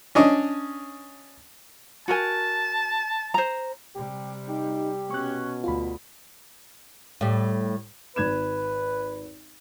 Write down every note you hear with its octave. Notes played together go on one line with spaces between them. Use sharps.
C#4 D4 D#5
F#4 A#4 G#5 A5
C5 A#5
C3 G3 G4
D#4 G4
B2 C#4 C#6 F#6
D2 F4 B5
A2 G3
G#1 B4 G#6 E7